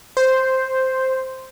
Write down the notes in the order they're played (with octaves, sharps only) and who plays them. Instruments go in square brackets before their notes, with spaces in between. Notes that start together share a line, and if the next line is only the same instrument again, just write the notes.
[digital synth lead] C5